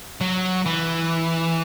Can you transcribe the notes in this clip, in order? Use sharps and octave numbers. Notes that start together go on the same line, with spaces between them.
F#3
E3